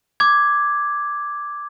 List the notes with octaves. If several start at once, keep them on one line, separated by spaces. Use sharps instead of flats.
D6 G#6